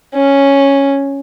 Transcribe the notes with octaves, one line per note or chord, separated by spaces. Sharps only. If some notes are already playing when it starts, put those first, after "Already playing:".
C#4